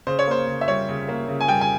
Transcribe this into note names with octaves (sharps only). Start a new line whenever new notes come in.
C#3 C5
C#5
A#3 C5
C#3
E5
G3 C#5
C#3
A#3
C#3
G#5
G3 G5
G#5